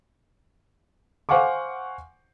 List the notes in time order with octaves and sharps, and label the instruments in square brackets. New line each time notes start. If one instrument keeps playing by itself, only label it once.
[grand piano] C5 F5 F#5 G#5 C#6 D6